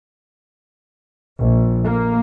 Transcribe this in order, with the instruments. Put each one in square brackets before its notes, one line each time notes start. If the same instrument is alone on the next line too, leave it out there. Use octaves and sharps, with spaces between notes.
[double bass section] A#1
A#3